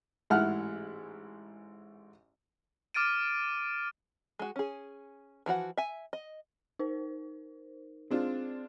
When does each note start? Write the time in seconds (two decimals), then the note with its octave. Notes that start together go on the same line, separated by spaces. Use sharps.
0.30 A1 G#2 E4 F#5 F6
2.94 D6 F6 A6 D7 D#7
4.39 G#3 F#4
4.56 C#4 G#4
5.46 E3 F3 F#4 F#5
5.77 E5 G#5
6.13 D#5
6.79 D#4 A#4 C5
8.11 G#3 C4 D4 F4